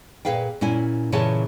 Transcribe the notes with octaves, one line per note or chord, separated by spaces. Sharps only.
A#2 G#4 B4 F5 G5
A#2 C#4 E4 G#5
A#2 C#3 E3 G#4 C#5 A5